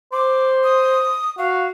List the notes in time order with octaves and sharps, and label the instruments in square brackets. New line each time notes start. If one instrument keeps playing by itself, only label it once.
[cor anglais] C5 [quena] D6
[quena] D#6
[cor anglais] F#4 [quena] F5